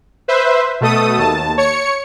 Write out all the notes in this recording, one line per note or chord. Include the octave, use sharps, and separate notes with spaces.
B4 C5 E5
B2 A3 A4 D#6
D#2 A5
C#5 C#7